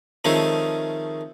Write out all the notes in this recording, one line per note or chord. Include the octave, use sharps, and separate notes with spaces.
D#3 F3 G#3 A3 C4 C#4